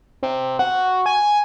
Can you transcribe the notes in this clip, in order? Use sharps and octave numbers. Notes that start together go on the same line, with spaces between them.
C3
F#4
G#5